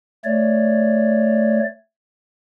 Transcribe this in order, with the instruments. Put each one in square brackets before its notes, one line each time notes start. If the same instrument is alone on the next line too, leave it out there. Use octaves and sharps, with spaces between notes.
[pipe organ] A3 C#5 D5